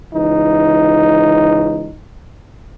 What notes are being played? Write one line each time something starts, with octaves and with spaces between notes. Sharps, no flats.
C#2 E3 D#4